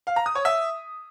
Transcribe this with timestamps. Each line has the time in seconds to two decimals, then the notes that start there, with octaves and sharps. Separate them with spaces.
0.07 F5
0.16 A#5
0.26 D#6
0.35 C#5
0.45 E5